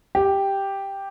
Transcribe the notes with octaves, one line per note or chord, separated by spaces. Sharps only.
G4